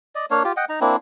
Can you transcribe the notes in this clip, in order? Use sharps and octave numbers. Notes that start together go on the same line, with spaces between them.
D5 D#5
A#3 D4 C#5 F5
F4 G4
D#5 F#5 G5
D#4 A#5
A#3 C4 D4 E4